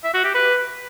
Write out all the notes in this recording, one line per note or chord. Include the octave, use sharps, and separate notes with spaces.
E5
F#4
G4
B4